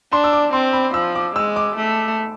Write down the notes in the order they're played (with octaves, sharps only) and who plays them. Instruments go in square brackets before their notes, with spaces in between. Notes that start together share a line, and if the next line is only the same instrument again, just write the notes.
[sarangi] D4 [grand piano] C6
[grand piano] E6
D6
[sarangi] C4 [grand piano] C6
[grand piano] B5
[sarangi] F3 [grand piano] E6
[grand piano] D6
[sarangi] G#3 [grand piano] E6
[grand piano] D6
[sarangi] A3